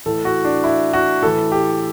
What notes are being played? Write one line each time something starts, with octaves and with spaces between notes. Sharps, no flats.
A2 E3 A4
F#4
D4
E4
F#4
A2 E3 A4
G4